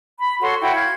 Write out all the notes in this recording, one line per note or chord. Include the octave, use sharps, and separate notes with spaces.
B5
F#4 A4 C#5 C6
E4 F#4 G5 B5
F5 G#6